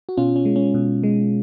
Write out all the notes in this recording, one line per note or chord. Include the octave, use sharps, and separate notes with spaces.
F#4
B2 C#4 F4
C#4
G#3
C#4
B2
G#3